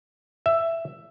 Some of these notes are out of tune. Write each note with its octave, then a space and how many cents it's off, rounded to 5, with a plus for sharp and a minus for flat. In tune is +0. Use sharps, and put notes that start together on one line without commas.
E5 +10